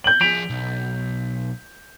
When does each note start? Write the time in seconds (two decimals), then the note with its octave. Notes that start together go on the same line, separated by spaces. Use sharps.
0.04 G6 F#7
0.21 F3 G#4 B6 D7 F7
0.50 B1